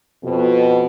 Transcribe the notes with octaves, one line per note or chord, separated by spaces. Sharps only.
F2 B2